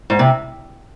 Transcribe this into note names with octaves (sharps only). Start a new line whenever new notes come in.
G#2
C3